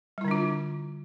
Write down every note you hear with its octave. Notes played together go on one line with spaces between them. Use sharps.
D3 G3 D4 E4 F4